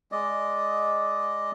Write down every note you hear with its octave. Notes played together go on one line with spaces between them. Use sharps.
G#3 D5 D#5